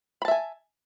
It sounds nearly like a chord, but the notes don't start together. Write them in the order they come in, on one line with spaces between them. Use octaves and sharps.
B5 A5 E5 G#5